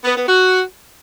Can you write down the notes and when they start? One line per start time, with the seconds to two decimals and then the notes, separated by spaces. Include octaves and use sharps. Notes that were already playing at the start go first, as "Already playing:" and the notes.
0.04 B3
0.16 B3
0.27 F#4